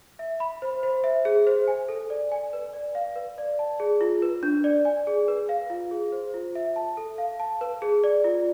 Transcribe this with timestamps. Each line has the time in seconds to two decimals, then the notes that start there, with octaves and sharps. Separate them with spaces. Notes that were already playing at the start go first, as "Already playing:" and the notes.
0.19 E5
0.40 B5
0.62 C5
0.83 C5
1.04 E5
1.25 G#4
1.47 C5
1.68 G#5
1.89 A4
2.10 D5
2.32 G#5
2.53 B4
2.73 D5
2.95 F5
3.16 B4
3.38 D5
3.59 A5
3.80 G#4
4.01 F4
4.22 B4
4.43 D4
4.64 D5
4.85 G#5
5.07 G#4
5.28 B4
5.49 F5
5.70 F4
5.91 G#4
6.12 C5
6.34 F4
6.55 E5
6.76 A5
6.97 A4
7.18 F5
7.40 A5
7.61 B4
7.82 G#4
8.04 D5
8.24 F4